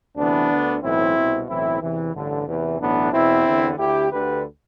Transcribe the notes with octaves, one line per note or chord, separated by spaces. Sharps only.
D2 C3 E3 B3 D4
D2 D3
B1 A2 E3 C4 E4
C2 B2
B1 A2 E3 C4 E4
E2 C3 E3
A1 G2 D3
E2 C3 E3
B1 A2 E3 B3 D4
E2 B2 C4 E4
E2 D3
D2 D3 E4 G4
D2 D3 G4 B4